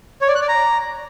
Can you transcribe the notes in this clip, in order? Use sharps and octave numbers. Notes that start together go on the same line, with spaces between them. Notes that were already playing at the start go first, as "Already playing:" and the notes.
C#5
D5
F#6
D5
A#5